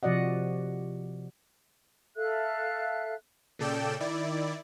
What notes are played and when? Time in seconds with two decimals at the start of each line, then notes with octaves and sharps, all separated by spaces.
0.03 C3 F3 F#4 D5 D#5 F#5
2.16 A4 E5 F5 F#6
3.59 A#2 C#3 A4 D5 G5 E7
4.00 D#3 E4 D5